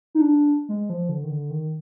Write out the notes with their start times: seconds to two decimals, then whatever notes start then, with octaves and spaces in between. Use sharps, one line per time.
0.15 D#4
0.21 D4
0.69 G#3
0.90 F3
1.09 D3
1.24 D#3
1.30 D3
1.50 D#3